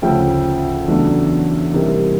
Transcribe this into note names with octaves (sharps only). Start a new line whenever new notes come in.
D2 C#3 F3 A3 G5
E2 C#3 F#3 A3 D4
C3 E3 G3 A#3 D#4